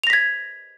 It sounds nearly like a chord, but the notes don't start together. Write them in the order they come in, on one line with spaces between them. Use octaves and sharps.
F7 A#6 B6 G#6